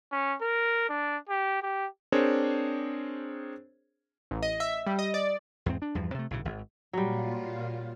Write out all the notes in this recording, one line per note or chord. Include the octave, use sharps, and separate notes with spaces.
C#4
A#4
D4
G4
G4
C4 D4 G#4 A#4 C5 C#5
A1
D#5
E5
G3
D#5
D5
E2 G#2 C4
D4
E2 G2 F3
C3 A3
B1 A2 C#3
G#1
A#2 F#3 G3 F4